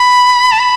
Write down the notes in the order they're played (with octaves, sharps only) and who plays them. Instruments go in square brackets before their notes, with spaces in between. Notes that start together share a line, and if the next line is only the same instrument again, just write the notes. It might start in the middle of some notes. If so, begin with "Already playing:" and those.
Already playing: [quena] B5
A5
B5